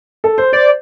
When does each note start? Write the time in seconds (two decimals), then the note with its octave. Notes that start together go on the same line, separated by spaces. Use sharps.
0.24 A4
0.38 C5
0.53 C5 D5